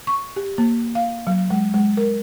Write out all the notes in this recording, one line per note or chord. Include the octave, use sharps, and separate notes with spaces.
C#6
G4
A#3
F5
F#3
G#3
G#3
A#4